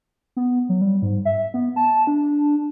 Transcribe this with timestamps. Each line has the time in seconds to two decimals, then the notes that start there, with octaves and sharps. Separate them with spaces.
0.36 B3
0.69 F#3
0.81 G3
1.02 G#2
1.25 E5
1.54 B3
1.76 A5
2.07 D4